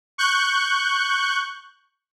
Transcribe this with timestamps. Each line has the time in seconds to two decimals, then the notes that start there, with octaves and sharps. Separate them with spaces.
0.18 C#6 F#6 G6